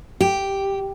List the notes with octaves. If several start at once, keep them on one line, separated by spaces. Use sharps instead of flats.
G4